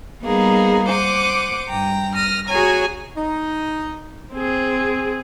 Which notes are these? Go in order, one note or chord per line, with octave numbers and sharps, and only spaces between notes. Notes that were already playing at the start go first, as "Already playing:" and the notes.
G3 A#3 B3 D#4 G#4
C5 F#5 D6 D#6
G2 G5 A#5
D#6 F6 A#6
F#4 G#4 C#5 G#5 A#5
D#4
C4 G#4